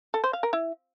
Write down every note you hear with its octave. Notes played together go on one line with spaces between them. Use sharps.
A4
C5
F5
A#4
E4